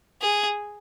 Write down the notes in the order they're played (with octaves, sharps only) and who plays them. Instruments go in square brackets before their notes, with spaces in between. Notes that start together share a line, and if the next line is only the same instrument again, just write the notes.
[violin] G#4